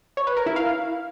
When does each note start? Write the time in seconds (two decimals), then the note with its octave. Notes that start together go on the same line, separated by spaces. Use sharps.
0.17 C#5
0.27 B4
0.37 A#4
0.46 E4
0.56 F5